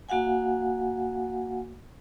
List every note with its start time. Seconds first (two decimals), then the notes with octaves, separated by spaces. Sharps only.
0.09 A#3 F#4 F5 F#5 G#5